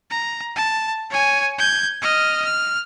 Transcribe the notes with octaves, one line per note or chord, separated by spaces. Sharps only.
A#5
A5
C#5 G#5
G6 G#6
D#5 F6
F6